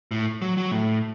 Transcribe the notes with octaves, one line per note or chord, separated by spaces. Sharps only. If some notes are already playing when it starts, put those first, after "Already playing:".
A2
F#3
F#3
A2